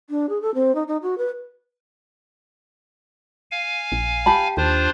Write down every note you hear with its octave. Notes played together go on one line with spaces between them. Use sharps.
D4
G#4
A4
C4
D#4
D#4
F#4
B4
F5 G#5
A#1
G4 A5 B5
D#2 D4 F4 C5